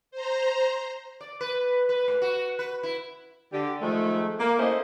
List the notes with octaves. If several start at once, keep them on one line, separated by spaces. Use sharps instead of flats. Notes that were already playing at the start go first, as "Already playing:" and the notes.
C5 A#5
D5
B4
B4
A2
F#4
B4
E4
D3 G4
D#3 F3 G#3 A3
A#3
A3 A#3 C#4 E4 C5 D#5